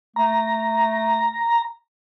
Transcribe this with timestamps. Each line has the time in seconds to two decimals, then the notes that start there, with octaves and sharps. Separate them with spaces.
0.16 A3 A#5